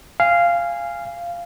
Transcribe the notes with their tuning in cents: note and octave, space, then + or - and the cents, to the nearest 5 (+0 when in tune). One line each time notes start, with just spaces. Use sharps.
F5 -10 G#5 -15